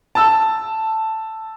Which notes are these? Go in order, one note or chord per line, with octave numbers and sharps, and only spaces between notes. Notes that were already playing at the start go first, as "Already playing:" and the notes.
A5 E6